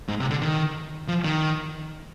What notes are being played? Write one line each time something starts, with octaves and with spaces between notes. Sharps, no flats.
G#2
C3
D3
D#3
F3
D#3